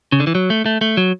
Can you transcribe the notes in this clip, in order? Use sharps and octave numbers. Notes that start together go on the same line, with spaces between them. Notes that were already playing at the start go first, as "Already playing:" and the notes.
C#3
D3
E3
F#3
A3
A3
A3
F#3